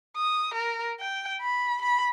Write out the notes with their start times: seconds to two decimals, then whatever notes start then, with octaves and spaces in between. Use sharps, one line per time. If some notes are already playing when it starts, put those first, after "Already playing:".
0.17 D#6
0.55 A#4
1.00 G5
1.41 B5
1.82 B5